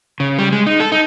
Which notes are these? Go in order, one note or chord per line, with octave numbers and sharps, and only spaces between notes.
C#3
G3
G#3
D#4
A4
D#4